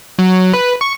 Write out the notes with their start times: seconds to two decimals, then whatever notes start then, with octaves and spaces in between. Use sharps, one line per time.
0.19 F#3
0.53 B4
0.81 C#6